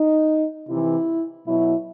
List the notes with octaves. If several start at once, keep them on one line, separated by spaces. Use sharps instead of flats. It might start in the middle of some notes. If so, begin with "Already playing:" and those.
Already playing: D#4
C3 E3 E4
B2 F#3 E4